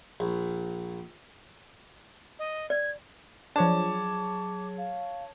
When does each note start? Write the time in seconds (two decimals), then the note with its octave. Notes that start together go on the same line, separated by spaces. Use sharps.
0.20 A#1
2.39 D#5
2.70 D5 G#6
3.56 F3 F#3 D4 G#4 C#5 A5 D6
4.78 F5